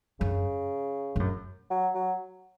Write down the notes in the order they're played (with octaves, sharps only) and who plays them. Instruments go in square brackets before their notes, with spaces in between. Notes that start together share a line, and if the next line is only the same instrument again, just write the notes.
[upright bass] F#2 [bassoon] C#3
[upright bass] G#2
F#2
[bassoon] F#3
F#3